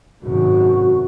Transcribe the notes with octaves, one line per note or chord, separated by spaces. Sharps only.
G#1 F#2 C3 F#4